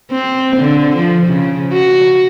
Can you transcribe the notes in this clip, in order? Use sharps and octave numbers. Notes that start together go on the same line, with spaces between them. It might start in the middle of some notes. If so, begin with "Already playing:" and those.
C4
D3
F3
C#3
F#4